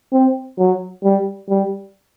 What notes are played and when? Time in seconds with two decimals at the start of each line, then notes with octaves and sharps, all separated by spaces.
0.13 C4
0.59 F#3
1.04 G3
1.49 G3